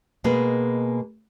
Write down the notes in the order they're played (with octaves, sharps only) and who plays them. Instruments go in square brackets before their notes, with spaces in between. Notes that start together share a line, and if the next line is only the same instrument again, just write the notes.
[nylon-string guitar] B2 G#3 A#3 G#4 B4